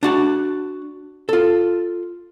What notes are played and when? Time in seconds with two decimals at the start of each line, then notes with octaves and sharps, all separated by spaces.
0.03 D4 F#4 A5
1.29 F4 A4